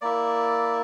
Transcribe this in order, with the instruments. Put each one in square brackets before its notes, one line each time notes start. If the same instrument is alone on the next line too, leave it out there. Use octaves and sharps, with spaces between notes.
[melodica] A#3 E4 D5